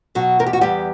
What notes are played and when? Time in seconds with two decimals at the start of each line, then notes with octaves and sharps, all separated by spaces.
0.15 B2 F#3 F#4
0.39 E2 A#4
0.46 G4
0.53 F#4
0.61 E2 G3 G4